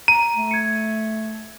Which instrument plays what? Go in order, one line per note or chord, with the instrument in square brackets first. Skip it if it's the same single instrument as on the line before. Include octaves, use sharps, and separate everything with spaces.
[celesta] A#5 [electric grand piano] D#7
[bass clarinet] A3
[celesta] G#6 C#7